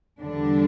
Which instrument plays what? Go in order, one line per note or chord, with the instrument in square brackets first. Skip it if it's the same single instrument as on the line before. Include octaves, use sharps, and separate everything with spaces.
[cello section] E2 D3 G3 D4